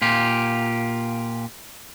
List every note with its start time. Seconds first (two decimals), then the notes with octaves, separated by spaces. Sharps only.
0.02 A#2 F4 G4